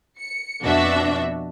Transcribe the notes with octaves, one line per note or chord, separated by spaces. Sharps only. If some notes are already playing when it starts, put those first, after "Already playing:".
C#7
F2 B2 D4 F#4 E5